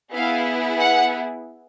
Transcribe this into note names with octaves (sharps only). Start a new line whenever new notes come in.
B3 E4 G#4 F5
F#5